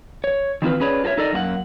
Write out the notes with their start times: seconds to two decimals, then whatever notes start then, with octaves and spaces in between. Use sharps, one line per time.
0.24 C#5
0.62 D#3 E3 C4 F4 B4
0.80 C#4 G#4 B4 C#5 D5
1.04 F4 F#4 A4 C#5 E5
1.17 D#4 A4 A#4 D5 D#5
1.33 F#2 A#3 F#4 F#5